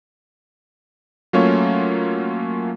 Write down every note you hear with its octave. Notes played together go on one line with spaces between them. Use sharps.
F#3 A3 A#3 C#4 F4 C#5